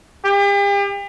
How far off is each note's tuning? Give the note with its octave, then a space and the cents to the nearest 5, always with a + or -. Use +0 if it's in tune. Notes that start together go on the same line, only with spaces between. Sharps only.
G4 +40